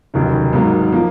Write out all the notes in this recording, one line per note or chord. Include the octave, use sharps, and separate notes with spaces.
F1 D#2 C#3 F#3
G#1 G#2 F#3 A#3
F3 A#3